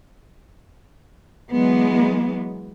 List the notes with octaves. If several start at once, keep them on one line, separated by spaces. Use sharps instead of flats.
E3 F#3 G#3 B3